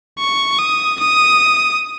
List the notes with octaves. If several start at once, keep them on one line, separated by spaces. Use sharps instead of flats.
C#6
D#6
D#6